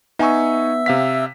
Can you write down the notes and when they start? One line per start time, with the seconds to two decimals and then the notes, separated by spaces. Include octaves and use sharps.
0.19 B3 D#4 E5 G#5 C#6 E6
0.86 C3 F5 B6